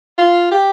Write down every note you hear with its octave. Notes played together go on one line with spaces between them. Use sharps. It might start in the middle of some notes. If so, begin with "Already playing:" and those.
F4
G4